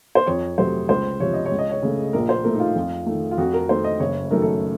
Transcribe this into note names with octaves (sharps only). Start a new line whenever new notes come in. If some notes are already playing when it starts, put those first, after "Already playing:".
C5
F2 C#5
C3 F#3 A3 C5
C#2 C5
C3 F3 C#5
D#5
C#5
C#2
D#5
C#5
C#3 A3
A#1 A#4
C5
A2 A3 A#4
D#4
F4
F2
D#3 A3
F4
F2 F#4
A#4
D#3 A3 C5
D#5
F#1 C#5
F#2 D#3 A3 A#4
A4